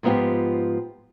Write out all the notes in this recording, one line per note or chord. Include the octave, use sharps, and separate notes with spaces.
G#2 F3 B3 E4 F4 G4